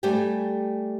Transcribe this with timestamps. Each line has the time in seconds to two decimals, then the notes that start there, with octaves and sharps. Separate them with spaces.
0.03 G3 A3 G4 G5 G#5